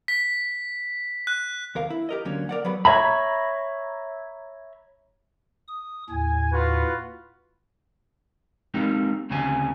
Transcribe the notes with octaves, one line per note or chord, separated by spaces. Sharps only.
B6
F#6
D#2 A#4 F5
E4
G4 A#4 D#5
D2 D3 F#3 A#3 C#4
A#4 D5 F#5
F#3 G3 B3 B4 F#5 B5
C#5 E5 A#5 B5
D#6
D#2 A2 G#5
F4 F#4 B4
G3 G#3 A#3 C4 D#4
D2 C#3 G3 C4 G#5